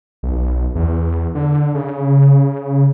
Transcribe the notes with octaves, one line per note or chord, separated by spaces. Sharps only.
B1
E2
D3
C#3